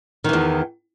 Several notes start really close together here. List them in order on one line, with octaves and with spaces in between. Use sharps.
D#3 E3 E2